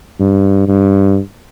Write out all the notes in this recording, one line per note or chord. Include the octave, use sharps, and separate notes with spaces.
G2
G2